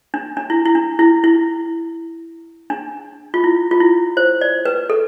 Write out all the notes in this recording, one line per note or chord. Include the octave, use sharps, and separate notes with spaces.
D4
D4
E4
E4
D4
E4
E4
D4
F4
E4
F4
E4
C5
D5
B4
A4